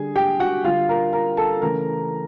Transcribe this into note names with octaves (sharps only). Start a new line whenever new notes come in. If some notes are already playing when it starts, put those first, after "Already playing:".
Already playing: D3 G3 G#4 G#5
G4 G5
F#4 F#5
D3 G3 F4 F5
A#4 A#5
A#4 A#5
A4 A5
C#3 E3 A3 A#4 A#5